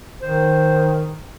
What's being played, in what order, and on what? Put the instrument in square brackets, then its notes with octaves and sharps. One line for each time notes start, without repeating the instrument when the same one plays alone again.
[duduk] D#3 [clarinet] C5